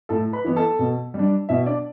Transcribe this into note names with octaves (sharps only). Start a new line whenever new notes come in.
A2 A4 A5
B4 B5
E3 B3
A4 A5
B2
G3
D4
B2 E4 E5
D4 D5